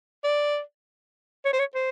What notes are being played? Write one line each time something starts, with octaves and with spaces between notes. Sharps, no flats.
D5
C#5
C5
C#5
C5